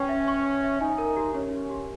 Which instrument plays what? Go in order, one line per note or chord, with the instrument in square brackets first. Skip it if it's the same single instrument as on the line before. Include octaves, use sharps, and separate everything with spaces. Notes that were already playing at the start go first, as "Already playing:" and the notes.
Already playing: [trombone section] C#4 [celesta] B4 G5 C#6
[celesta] E5
C#6
C#6
E5
[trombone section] D#4 [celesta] G#5
[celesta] A#4
G4
[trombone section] C#4 [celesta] C#5
[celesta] G4
G4